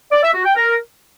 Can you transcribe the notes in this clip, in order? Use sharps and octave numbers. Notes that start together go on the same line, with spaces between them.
D5
E5
F#4
G5
A#4